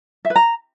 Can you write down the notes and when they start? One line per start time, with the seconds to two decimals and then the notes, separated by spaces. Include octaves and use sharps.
0.25 E5
0.30 B4
0.36 A#5